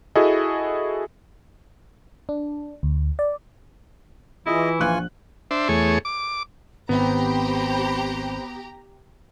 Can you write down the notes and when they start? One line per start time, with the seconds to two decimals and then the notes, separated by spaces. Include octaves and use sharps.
0.15 E4 F#4 G#4 A4 D#5
2.29 D4
2.83 D2
3.19 D5
4.46 E3 E4 F4 G#4 D#5
4.80 A#1 F4 G#5 C#6 F#6
5.51 D4 C5 E5
5.69 E2 A3 G#4 C#5
6.05 D6
6.89 G#1 B3 C4 G4 C5 A#5 B5